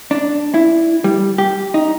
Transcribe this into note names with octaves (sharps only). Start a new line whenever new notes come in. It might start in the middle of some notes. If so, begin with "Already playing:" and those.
D4
E4
G3
G4
D#4